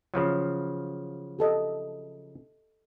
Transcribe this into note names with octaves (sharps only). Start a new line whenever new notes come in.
C#3 F3 F#3
G4 A4 D#5